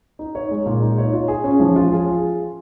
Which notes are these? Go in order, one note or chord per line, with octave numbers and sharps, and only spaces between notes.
D#4
C#5
G#3
A#2
D#4
C#5
F4
G#4
C#4
F3
F4
G#4